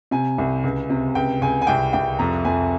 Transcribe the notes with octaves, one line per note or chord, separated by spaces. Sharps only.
C3 G#5
C2
C#2
C3
C#2 G5
C#2 G#5
G#5
C2 G5
C2 G5
F2 A#5
F2 G#5